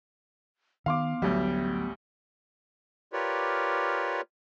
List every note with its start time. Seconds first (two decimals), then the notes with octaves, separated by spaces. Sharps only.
0.86 D#3 B3 F5 C6 D6
1.22 A1 D2 F#3 G3
3.13 F4 G4 A#4 B4 C#5 D5